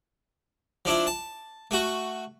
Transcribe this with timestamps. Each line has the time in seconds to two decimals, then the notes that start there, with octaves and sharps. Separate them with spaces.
0.85 F3 D4 E4
1.07 A5
1.71 A3 F#4